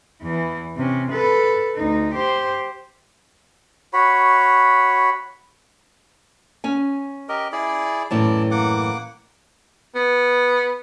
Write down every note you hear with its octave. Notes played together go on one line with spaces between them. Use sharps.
E2 E3
C3 C#4
A4 B4
D2 D#4
G4 C5
F#4 C#5 B5
C#4 G#5
G4 A#4 D#5
E4 G#4 D5
F#2 A2 E3 D5 A5
A#3 F#5 D6
B3